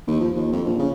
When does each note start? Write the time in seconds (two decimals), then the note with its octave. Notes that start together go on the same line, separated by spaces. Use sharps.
0.08 D#2
0.21 F3
0.35 D#2
0.52 F2
0.65 A#1
0.79 C#3